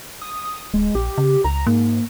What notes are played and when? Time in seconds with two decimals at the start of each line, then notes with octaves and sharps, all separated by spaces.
0.21 D#6
0.74 D1 G#3
0.95 A#1 G4
1.18 C#3
1.44 C#2 A#5
1.67 G#2 A#3